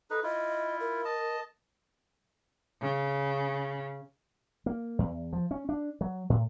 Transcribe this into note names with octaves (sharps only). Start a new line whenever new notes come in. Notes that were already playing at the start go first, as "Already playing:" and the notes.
D#4 A4 B4
E4 F4 D#5
A#4
D#5 A5
C#3
A#3
E2
F3
C#4
D4
F#3
A2